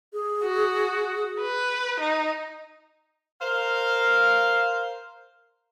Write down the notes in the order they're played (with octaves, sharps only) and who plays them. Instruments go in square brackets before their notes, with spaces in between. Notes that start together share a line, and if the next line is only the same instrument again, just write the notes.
[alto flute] G#4
[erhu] F#4
B4
D#4
[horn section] A#4 C5 F5